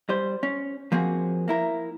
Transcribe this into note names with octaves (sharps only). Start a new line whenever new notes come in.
G3 C5
C#4
F3 A#3 C4 F#4 G#4
A#3 E4 A#4